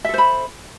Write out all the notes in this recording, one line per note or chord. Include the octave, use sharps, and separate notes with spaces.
A4 C5 E5 B5